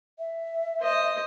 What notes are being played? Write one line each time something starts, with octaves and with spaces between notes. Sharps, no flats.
E5
C5 D#5